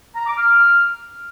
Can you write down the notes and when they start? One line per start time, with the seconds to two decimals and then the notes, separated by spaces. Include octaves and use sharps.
0.15 A#5
0.27 D6
0.38 F6